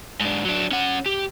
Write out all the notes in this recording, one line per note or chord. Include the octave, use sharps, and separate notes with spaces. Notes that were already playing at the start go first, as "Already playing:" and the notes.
G#2 D4
F#3 D4
C#4 F#5
G4